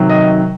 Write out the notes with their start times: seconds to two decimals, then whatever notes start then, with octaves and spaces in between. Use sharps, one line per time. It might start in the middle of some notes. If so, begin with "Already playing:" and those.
Already playing: C3 D#3 F#3
0.09 D#5